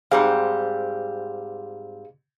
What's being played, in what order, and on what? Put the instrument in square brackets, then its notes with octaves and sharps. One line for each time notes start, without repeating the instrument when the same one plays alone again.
[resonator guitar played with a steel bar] G#2 G3 C4 [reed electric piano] G#4 F5